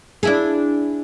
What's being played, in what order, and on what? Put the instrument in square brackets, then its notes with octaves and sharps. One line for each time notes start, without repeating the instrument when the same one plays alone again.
[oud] D4 E4 G#4